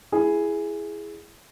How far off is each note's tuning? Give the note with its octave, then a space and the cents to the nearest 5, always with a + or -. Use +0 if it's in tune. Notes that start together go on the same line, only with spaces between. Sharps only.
E4 +10 G#4 +0